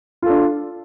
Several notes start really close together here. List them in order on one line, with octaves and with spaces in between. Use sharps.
F4 A4 D4